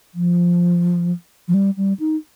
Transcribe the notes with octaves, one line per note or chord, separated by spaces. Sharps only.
F3
F3
G3
G3
D#4